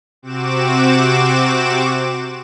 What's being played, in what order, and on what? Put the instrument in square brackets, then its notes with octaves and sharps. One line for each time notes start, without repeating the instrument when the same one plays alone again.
[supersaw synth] C3 C4 F#4 D6 E7